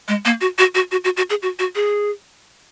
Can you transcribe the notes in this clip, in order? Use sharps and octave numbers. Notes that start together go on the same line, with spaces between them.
G#3
A#3
F#4
F#4
F#4
F#4
F#4
F#4
G#4
F#4
F#4
G#4